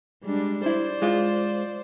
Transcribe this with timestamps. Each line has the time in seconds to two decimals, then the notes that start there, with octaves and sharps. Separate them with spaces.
0.24 G3 G#3 D4
0.66 E4 C5 D5
1.02 G#3 F4